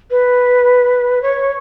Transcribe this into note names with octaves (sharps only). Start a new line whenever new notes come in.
B4
C#5